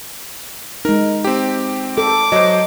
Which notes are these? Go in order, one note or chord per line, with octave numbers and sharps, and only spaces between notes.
G#3 D#4 A#4
C4 G4
A4 D6
F#3 C5 D#5